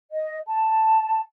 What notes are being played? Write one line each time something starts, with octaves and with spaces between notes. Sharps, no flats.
D#5
A5